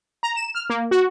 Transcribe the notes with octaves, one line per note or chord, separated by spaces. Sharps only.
A#5
E7
F6
A#3
F#4